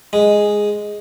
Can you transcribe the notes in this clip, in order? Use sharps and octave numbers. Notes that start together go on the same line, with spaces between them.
G#3